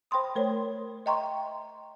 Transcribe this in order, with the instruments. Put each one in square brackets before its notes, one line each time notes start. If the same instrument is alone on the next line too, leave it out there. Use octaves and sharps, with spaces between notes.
[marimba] C5 G5 B5 C6 D#6
A3 A#4 C5 C#5
D#5 E5 G5 A#5 C6 C#6